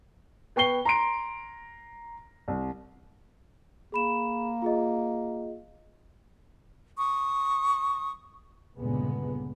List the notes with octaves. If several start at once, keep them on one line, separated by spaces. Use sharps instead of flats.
B3 G5 C#6 C7 G7
A#5 C6 D7
C2
A#3 G#4 B5 E7
F4 G#4 D#5
C#6 D#6
C#2 G2 A#2 D3 G#3 B3